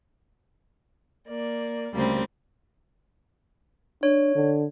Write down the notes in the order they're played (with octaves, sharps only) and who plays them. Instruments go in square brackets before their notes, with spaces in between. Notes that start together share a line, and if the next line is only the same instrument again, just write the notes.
[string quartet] A#3 D5
D2 C#3 G3 A#3 C4
[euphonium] D4 [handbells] C#5
[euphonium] D3